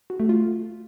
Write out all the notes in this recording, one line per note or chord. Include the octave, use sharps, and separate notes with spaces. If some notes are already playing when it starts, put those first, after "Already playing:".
F#4
A3
F4